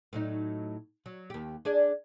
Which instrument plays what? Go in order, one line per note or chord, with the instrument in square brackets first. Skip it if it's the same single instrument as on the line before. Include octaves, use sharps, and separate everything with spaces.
[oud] A2 F#3 D#4
F#3
D#2 G4
D4 G#4 D5